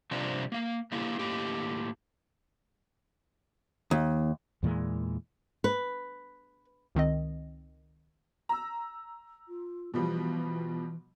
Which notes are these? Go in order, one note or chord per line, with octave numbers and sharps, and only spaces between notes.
C3 F3 G3 A#3 C4 D4
A#3 F5
A3 A#3 E4 G4
A2 A#3 G4
D#2
E2 A#2 E3 G#3
B4
C#2 D#3 C4 D#5
A#5 E6
F4
B2 E3 F3 G3